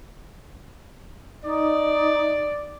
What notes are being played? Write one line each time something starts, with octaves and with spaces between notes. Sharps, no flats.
D#4 D5